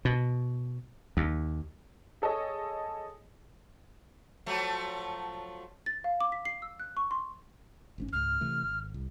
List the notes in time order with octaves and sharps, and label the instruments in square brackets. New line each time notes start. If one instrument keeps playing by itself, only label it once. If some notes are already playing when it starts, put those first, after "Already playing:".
[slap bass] B2
D#2
[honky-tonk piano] G#4 A4 C#5 D#5
[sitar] F3 F#3 A3
[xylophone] A6
F5
D6
B6
C7
E6
F#6
C#6
C6
[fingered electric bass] G1 G#2 C#4
[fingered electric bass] C#2 G#2 [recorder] F6
[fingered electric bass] C3 E3 A3
G#1
C2